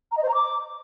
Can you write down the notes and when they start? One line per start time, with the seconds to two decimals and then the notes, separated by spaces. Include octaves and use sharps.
0.11 A#5
0.17 D#5
0.23 C5
0.28 A#5
0.34 D6